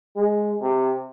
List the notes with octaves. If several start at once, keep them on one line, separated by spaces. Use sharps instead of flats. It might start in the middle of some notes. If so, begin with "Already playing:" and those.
G#3
C3